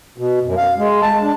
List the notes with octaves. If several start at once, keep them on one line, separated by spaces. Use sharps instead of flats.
B2
F#2
F5
G#3
A5
D4